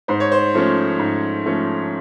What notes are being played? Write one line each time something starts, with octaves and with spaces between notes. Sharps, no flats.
G#2 C5
C#5
C5
F3 A3 C#4
G#2
F3 A3 C#4